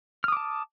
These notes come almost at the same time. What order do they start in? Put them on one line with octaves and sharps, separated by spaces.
F6 D#6 D6 A5